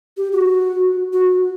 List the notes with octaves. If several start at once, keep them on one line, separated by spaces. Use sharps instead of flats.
G4
F#4
F#4